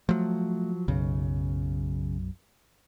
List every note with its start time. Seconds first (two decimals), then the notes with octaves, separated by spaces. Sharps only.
0.09 F3 F#3 A3
0.88 B1 F#2 C#3